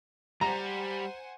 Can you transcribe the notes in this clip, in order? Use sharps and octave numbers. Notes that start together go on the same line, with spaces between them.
G3 C5 F#5 G#5 A#5